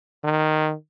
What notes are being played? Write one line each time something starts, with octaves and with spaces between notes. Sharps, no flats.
D#3